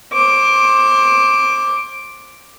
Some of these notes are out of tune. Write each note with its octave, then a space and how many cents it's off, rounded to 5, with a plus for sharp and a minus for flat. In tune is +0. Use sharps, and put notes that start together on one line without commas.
C5 +30 D6 +0